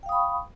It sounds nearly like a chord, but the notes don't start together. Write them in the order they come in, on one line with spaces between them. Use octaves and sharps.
G5 F5 D#6 B5 C#6